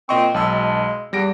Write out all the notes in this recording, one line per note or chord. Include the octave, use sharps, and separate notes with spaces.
A#2 C4 D#5 C#6
B1 G#3 A5 E6
E2 G3 A#6 D7